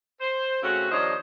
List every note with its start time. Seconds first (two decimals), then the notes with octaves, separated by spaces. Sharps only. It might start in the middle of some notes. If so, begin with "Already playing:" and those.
0.21 C5
0.62 C#3 A3 C4 C#4 F#4
0.91 D#2 F3 D4 C5 C#5 D#5